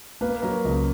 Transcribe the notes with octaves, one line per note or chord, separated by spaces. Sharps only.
A#3 B4
F#3 A#4
C#2